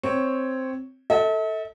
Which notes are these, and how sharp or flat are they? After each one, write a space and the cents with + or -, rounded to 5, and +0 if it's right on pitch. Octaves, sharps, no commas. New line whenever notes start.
C4 +0 C#5 +0
A4 +10 E5 -45